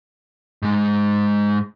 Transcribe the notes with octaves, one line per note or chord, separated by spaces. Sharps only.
G#2 G#3